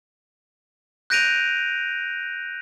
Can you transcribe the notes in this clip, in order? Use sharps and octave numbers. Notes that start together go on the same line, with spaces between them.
F#6 G6 A#6 D7 D#7 F7